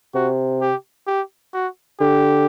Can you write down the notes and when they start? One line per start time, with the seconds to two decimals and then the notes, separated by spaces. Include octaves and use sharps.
0.15 C3 F#4
0.61 G4
1.07 G4
1.53 F#4
2.00 D3 G4